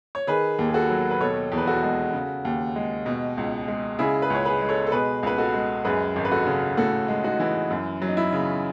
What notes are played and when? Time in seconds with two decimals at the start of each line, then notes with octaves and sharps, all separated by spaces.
0.15 C#5
0.27 D#3 G#4 B4
0.59 D#2
0.68 G#4
0.74 F#4 A4
0.90 F#3
1.11 B4
1.20 B2 A4 C#5
1.52 E2
1.58 B4
1.67 F#4 A4
1.83 G#3
2.13 C#3
2.45 D#2
2.76 G#3
3.06 B2
3.37 C#2
3.68 G#3
3.99 C#3 E4 G#4
4.22 G#4 B4
4.30 C#2 C#5
4.45 G#4 B4
4.61 G#3
4.69 A4 C#5
4.86 A4
4.92 B2 G#4 B4
5.23 C#2 B4
5.38 F#4 A4
5.54 G#3
5.85 F#2 G#4 B4
6.16 G#1
6.25 B4
6.32 F#4 A4
6.47 C#3
6.77 A2 F#4 A4
7.08 G#3
7.24 D#4 F#4
7.40 E3
7.70 F#2
8.02 F#3
8.08 D#4
8.17 E4
8.32 C#3